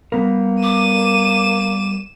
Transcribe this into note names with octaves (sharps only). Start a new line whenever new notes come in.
G3 A#3 B3 A#4
D6 D#7 E7